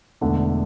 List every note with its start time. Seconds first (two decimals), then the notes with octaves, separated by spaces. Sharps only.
0.21 E1 E2 D3 A3 D4